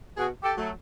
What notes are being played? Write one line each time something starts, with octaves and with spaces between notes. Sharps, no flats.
B2 F#4 G#4
G4 A4
F#3 A3